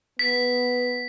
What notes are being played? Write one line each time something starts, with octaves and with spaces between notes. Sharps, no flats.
B3 B6